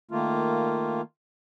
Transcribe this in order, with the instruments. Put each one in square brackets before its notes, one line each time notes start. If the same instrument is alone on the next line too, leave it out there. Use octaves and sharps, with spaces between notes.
[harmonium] D#3 A3 A#3 F4